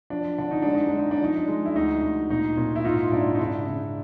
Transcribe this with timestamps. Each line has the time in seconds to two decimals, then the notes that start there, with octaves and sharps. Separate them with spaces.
0.10 F3 D4
0.38 D3 D4
0.51 D#4
0.62 G#3 D4
0.75 D#4
0.87 D4
0.93 G#3
0.99 D#4
1.11 D4
1.21 F3 D#4
1.36 D4
1.48 G#3
1.66 E4
1.76 D2 D#4
2.02 D2
2.30 A#2 D#4
2.57 A#2
2.76 E4
2.85 G#2 D#4 F4
3.11 G#2 D4 E4
3.35 D#4
3.39 C#3 D4 E4
3.67 C#3